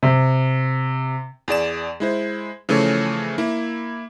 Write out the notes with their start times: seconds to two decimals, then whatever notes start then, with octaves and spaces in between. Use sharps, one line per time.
0.03 C3
1.48 E2 G#4 D5 E7
2.00 G#3 E4 C5
2.69 C#3 E3 F3 A3 A4 C#5
3.38 A#3 E4